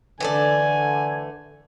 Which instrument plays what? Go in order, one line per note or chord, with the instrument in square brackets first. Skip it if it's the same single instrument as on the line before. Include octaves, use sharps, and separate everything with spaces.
[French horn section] D3 [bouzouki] E3 A3 D5 [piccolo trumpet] G#5